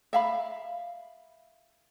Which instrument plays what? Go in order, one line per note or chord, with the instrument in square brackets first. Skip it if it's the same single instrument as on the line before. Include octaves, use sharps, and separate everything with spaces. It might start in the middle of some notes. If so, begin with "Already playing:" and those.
[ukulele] E5 F5 B5